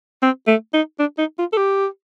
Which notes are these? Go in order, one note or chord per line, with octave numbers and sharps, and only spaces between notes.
C4
A3
D#4
D4
D#4
F4
A4
G4